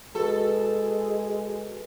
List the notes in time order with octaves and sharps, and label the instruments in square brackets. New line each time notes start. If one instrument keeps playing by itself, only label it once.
[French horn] G#3 [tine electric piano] F#4 B4 [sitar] A4